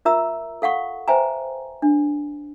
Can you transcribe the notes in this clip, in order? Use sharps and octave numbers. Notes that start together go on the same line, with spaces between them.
F4 A#4 E5 A#5 E6
A4 F5 F#5 C#6
B4 C5 E5 G5 G#5 A#5
D4